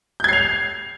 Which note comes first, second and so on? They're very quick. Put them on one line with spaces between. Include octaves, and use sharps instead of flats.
G6 G#6 C7 F7